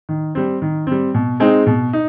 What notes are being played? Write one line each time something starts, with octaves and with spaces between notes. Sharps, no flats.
D#3
G3 C4
D#3
G3 C4
B2
G#3 C4 D#4
B2
D#4